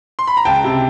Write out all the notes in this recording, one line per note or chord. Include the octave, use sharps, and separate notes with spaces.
C6
B5
A#5
C#2 G5 A5
C3